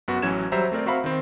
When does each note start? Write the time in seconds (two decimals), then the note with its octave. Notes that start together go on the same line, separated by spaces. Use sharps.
0.08 F#2 B3 F#4
0.22 A1 E3 F#3 C#4 G#6 E7
0.52 F#3 G3 C5 E5 A#5
0.72 A3 C4 A#4 D5
0.86 C4 F#4 E5 F5 A#5 B5
1.04 D#3 C4